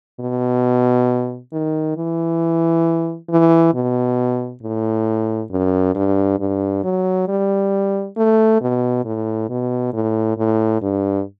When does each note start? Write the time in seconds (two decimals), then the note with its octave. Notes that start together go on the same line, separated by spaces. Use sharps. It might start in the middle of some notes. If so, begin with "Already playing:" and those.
0.20 B2
1.53 D#3
1.97 E3
3.30 E3
3.74 B2
4.63 A2
5.51 F#2
5.95 G2
6.40 G2
6.84 F#3
7.28 G3
8.17 A3
8.61 B2
9.05 A2
9.50 B2
9.93 A2
10.38 A2
10.82 G2